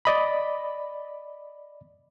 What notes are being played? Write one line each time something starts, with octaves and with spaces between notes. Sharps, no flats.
D5 D#5 B5